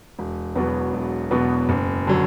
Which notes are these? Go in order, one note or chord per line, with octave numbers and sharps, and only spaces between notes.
E1
E2 B2 F#3 B3
E1
E2 B2 F#3 B3
F#1
D3 F#3